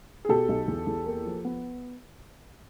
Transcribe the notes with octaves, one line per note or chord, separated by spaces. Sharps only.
G#4
B2 G4 A4
B1
E2
E2
A#3
F3
B3